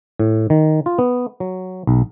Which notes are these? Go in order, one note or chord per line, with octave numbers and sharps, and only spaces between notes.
A2
D#3
F4
B3
F#3
B1